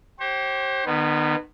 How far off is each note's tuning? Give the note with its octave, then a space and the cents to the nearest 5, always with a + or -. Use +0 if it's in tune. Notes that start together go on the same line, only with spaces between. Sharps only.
G4 -25 C5 +40
D#3 -35 B3 +0